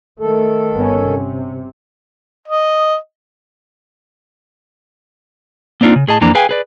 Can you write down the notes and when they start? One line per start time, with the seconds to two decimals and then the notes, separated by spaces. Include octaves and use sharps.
0.20 D#3 A3 A4
0.74 G1 B3 C#4
1.05 C3
2.48 D#5
5.81 A#3 C4 D4 D#4 F4
5.96 C#3
6.08 A2 G#4 D#5 A5
6.21 F2 E3 A#3 D4 A#5
6.35 G#4 B4 F5 G5 G#5
6.49 G#4 B4 D5